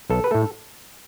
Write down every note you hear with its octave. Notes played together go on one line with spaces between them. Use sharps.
B1 A4
B4
A2 A3 A4